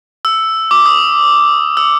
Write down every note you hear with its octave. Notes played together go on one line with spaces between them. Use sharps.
E6
D6
D#6
E6